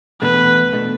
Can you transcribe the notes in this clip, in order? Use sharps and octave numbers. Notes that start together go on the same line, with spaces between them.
E2 B2 A3 D4 B4
B2 A3 D4